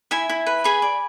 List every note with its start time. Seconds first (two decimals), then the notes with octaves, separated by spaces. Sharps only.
0.11 E4 E5 G#5
0.29 E4
0.46 B4
0.64 G#4 G#5 B5
0.82 D5